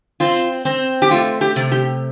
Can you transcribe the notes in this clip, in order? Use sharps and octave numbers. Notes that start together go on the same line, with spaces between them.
C4 F4
C4
G4
A3 F4
G4
C3
G4